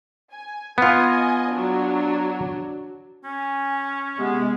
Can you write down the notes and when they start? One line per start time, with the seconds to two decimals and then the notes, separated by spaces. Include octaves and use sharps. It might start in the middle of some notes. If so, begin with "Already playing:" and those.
0.31 G#5
0.78 B3 F4 D#5 G#5
1.49 F#3 D4
3.24 C#4 G#5
4.19 C3 G#3 B3